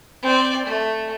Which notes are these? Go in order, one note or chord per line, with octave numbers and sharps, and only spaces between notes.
C4 D5
A3